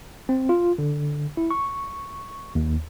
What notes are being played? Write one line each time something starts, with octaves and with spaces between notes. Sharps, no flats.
C4
F4
D3
E4
C#6
D#2